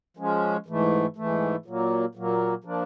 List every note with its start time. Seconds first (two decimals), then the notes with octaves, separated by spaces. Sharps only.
0.17 F3 G#3 C#4
0.66 G#2 E3 A3
1.16 G#2 E3 A3
1.66 A#2 F#3 A#3
2.15 A#2 F#3 A#3
2.64 F3 A#3 D4